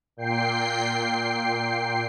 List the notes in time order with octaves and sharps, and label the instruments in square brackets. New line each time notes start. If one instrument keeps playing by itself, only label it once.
[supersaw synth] A#2 G5 C7